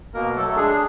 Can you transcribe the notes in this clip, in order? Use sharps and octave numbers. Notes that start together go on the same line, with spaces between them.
B2 A#3 A#4
F#3 A3 A4
A4
G#3 D4 G#4